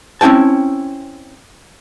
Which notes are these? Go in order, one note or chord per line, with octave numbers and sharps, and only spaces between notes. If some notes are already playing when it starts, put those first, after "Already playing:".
C4 C#4 E4 G5 A5